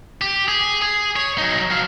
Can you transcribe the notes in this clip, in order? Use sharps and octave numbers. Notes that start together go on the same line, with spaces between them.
G4
G#4
G#4
C#5
F#3 D#4
F#3 F5